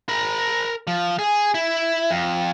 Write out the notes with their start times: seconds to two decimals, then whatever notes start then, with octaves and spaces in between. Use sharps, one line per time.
0.09 A#4 B5
0.87 F3
1.19 G#4
1.54 E4
2.11 F2